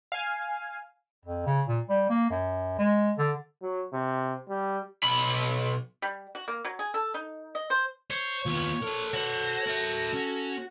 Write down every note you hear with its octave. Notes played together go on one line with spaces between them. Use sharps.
F5 G#5
F2
C#3
A#2
G3
A#3
F#2
G#3
D3
F#3
C3
G3
B1 B5
G3
F#4
A#3
F#3
G#4
A4
D#4
D#5
C5
C5 C#5
D#2 B3 F4
A4 A#4 C5
F#4 C5 C#5
A#4 E5
C#4